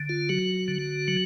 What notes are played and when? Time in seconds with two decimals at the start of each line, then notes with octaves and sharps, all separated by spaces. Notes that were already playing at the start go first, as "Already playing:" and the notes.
Already playing: D3
0.09 F4
0.29 F#3 F#4
0.68 D3
1.08 F#3